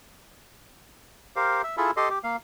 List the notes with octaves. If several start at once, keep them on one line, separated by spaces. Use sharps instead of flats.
G4 A#4 C5 F5
E5
E4 F4 G#4 A4 E5
G4 A4 D#5 C6
G4
A#3 F5